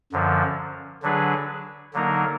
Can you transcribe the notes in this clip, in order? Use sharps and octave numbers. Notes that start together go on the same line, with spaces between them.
F#2 D3 F3
D3 F#3 D4 G#4 B4
D3 F#3 A#3 D#4 A#4